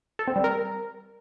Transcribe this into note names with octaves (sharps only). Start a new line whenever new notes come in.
A4
C4
G3
A#4